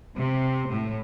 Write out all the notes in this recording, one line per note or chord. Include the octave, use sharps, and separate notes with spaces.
C3
A2